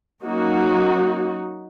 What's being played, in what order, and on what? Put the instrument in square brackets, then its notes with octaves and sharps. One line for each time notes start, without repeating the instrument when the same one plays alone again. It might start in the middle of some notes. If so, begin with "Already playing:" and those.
[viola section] F#3 A#3 C#4 D#4 F#4